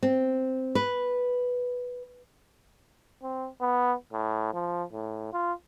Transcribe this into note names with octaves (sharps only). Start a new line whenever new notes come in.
C4
B4
C4
B3
A2
F3
A2
F4